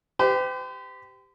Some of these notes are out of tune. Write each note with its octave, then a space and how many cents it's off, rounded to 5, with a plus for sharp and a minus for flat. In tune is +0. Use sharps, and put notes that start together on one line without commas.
G4 +0 C5 -45